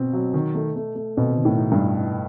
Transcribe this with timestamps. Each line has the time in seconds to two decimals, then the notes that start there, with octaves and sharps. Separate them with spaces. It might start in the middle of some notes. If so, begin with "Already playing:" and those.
Already playing: B2 C4
0.13 F#3
0.34 D#3
0.55 A3
0.76 A3
0.95 A3
1.17 B2 C4
1.37 D#3
1.45 A2
1.58 D#4
1.72 G2
1.79 D#4
2.00 E4